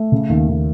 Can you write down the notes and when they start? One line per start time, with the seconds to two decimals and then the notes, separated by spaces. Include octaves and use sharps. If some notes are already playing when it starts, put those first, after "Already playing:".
Already playing: A3
0.12 C#3
0.29 D#2
0.48 D#2